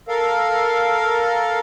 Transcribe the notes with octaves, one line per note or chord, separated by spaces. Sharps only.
A4 A#4 F5